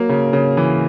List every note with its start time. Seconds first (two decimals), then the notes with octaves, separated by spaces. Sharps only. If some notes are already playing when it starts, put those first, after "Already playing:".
Already playing: F#3 A#3
0.09 C#3
0.33 C#3
0.57 E3